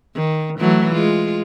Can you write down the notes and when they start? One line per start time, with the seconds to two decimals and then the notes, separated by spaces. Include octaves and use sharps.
0.15 D#3
0.59 E3 F#3 A3
0.93 G#3 F4